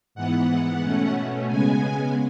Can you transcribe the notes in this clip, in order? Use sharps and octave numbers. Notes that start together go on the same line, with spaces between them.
G#2 E3 B3 F#5
B2 A3 C#4
C#3 G#3 B3 G#5